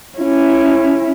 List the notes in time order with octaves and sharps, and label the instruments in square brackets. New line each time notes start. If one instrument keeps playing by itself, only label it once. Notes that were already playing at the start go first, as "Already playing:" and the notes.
[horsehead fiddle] C#4 E4